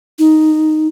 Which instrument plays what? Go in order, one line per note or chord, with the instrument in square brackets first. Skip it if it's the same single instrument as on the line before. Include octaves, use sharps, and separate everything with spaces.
[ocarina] D#4